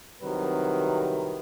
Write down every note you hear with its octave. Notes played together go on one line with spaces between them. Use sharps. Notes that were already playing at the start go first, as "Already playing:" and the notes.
C2 C3 D#3 F#3 B4